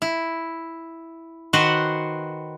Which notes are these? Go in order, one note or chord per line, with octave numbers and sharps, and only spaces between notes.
E4
D#3 F#4 B4 C5 F#5